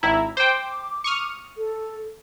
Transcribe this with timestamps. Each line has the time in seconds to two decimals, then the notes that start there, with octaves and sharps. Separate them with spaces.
0.03 G#1 E4 A#5
0.37 C5 G5 D6
1.04 C#6 D#6 F6
1.57 A4